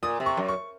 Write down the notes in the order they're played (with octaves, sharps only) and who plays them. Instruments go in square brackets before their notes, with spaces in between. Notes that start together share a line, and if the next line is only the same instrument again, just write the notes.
[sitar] A#2 [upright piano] D#6
[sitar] C3
[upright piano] C#6
[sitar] F#2
[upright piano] C#6